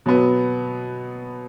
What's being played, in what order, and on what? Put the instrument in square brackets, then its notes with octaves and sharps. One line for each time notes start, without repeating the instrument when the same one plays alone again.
[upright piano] B2 F#3 B3